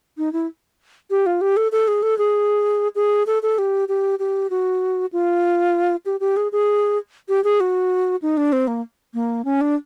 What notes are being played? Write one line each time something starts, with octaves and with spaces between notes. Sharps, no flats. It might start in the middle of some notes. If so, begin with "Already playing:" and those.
D#4
E4
G4
F4
G4
A4
A4
G#4
A4
G#4
G#4
A4
A4
G4
G4
G4
F#4
F4
G4
G4
G#4
G#4
G4
G#4
F#4
D#4
D4
C4
A#3
A#3
C#4
D4